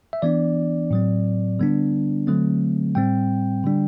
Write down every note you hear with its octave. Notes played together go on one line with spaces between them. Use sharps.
E5
E3 B3 D4 D5
A2 F#3 C4
D3 G3 B3 D4
D3 F#3 A3 C4
A2 G3 C4 G5
D3 G3 D4